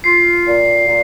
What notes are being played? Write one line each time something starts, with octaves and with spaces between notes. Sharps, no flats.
F4 C7
A#2
A#2